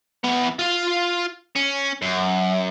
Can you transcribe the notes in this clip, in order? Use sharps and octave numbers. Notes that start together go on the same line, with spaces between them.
E2 B3
F4 F5
C#4
F#2